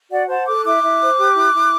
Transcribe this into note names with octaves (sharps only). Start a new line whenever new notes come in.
F#4 D5 F#5
C5 F#5 A5
A4 D6 F#6
E4 D6 F#6
E4
C5
G4
E4
E4